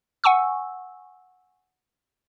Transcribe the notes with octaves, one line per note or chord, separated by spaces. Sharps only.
F#5 G#5 C#6 E6